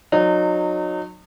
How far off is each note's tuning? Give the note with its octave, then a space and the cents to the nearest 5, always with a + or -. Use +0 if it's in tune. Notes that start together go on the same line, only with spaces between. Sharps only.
F#3 -25 D#4 -30